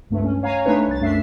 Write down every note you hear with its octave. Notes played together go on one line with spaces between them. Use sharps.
C#2 G2 A3
C#4
C#5 F5 G#5 A#5
A3 D4 D#4 B4 C#5
C2 A6
F#2 A3 D4 E5 C7